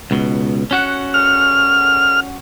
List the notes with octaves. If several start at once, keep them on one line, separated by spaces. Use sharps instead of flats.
C#2 B2
C#4 F#4 F#5
F6